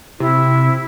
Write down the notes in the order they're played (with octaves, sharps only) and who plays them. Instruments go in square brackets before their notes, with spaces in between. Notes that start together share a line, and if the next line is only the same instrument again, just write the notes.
[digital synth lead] C3 [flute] E4